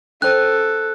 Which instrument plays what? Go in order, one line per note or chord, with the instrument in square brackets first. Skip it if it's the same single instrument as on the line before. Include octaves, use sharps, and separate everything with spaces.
[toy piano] C#4 C5 [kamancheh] A4 [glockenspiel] F#6